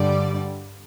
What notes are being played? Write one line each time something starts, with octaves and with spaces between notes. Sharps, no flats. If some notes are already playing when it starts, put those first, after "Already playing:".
Already playing: G2 D3 G3 D5